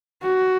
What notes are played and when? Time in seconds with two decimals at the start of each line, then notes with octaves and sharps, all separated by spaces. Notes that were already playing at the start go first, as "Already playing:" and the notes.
0.23 F#4